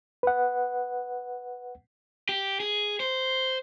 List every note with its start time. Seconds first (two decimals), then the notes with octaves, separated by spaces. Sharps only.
0.23 B4 F#5
2.29 G4
2.60 G#4
3.00 C5